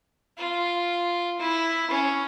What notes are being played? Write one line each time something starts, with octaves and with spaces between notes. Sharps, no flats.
F4
E4
C#4